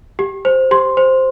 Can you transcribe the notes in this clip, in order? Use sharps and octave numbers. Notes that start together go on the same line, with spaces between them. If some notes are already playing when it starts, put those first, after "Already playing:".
G4
C5
G4 C6
C5